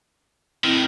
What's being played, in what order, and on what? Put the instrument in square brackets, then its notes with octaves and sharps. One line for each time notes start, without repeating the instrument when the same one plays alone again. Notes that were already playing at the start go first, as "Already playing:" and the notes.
[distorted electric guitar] A2 D#3 [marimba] C4 E4